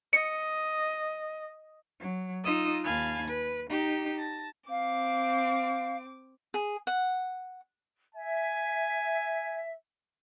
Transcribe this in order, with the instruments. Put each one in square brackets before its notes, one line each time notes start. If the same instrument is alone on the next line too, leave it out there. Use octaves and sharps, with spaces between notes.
[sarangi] D#5 [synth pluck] C#7
[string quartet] F#3
D#4 F4 D#5 D#6 E6
D#2 F5 G#5 A5 B5
B4
D#4 G4
A5 A#6
[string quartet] C4 D6 [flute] F5
[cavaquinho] G#4
F#5
[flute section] E5 [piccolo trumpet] G#5